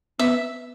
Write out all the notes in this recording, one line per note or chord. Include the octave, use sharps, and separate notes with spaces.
B3 E5